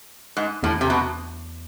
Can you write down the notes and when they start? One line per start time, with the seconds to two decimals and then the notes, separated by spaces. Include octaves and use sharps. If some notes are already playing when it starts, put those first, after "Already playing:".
0.37 G#2
0.63 E2 A2
0.81 C3
0.90 B2